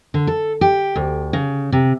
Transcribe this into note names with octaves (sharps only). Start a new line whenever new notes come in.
D3
A4
G4
D2
C#3
C3